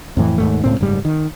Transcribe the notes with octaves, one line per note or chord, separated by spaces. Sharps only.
F2 A2 E3
D#2 G#2 A3
C#2 A2 C4
F#1 G#2 G3
D#3